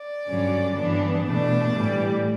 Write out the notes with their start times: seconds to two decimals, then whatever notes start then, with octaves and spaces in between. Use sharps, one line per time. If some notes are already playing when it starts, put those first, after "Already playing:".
Already playing: D5
0.27 G2 D3 F#3 C#4
0.77 G2 E3 B3 D4
1.25 B2 A3 D4 D5
1.74 A2 E3 G3